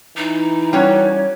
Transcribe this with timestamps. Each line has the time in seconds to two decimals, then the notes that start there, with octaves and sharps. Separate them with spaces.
0.17 E3 D#4
0.73 G3 C#4 F#4 C#5